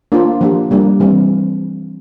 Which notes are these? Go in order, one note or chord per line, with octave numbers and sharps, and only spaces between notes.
A#3 D4 F4 C5
F3 A#3 D4 G4
G3 A#3 D4
E3 G3 C4